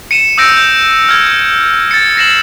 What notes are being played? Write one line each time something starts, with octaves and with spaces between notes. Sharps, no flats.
C#7 D#7 E7
D#6 E6 G6 A#6 D7
G6
F6 G#6
A6 C#7
A#6 C7 E7 F#7